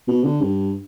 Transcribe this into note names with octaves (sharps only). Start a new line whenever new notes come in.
B2
D3
G2